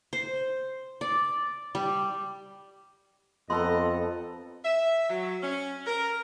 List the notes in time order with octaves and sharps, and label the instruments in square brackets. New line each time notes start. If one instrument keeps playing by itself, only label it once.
[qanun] C5
D5
G3
[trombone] F2 [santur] B3 A4 A#5 [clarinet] D#5 [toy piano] C6
[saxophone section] E5
F#3
C#4
A#4